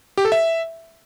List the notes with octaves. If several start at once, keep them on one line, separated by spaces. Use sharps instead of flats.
G4
A4
E5